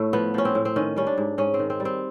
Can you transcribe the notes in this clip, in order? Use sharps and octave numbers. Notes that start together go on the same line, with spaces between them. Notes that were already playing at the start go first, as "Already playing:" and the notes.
Already playing: A2 A3
F3 B3
F3 C#4
C4
A2
C4
D#3 C#4
G3 C#4
D4
G#2
G#2 C#4
C4
D#3
C4
G3
C4